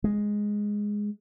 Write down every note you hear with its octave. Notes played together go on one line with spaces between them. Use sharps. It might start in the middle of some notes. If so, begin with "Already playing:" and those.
G#3